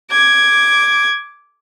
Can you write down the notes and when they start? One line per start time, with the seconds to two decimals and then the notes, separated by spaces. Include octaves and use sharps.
0.11 D6 G#6